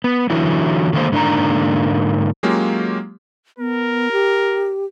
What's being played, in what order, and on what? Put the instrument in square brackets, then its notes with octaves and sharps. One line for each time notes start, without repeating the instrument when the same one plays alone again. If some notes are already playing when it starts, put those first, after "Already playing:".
[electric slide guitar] B3
D3 E3 F#3 E4
D3 D#3 G#3 A#3 A4 C5
G#2 D3 A#3 D4 D#4 A#5
[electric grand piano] F#3 G#3 A#3 C#4 F4 G4
[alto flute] B3 [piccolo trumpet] A#4
[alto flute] G4